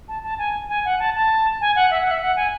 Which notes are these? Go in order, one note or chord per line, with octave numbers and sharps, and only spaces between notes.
A5
A5
G#5
G#5
F#5
A5
A5
G#5
F#5
E5
F#5
E5
F#5
G#5